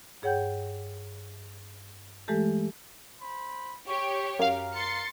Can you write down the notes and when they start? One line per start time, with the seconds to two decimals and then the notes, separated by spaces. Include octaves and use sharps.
0.22 G2 G#4 C#5 F#5 G5 G6
2.28 E3 G#3 A3 G4 A4
3.20 C5 B5
3.87 G4 C#5 C#6
4.39 F#2 A#4 F5
4.74 C6 A6 C#7